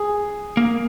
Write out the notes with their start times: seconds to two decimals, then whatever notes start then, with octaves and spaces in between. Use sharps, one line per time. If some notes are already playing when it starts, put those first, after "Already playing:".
Already playing: G#4
0.57 A#3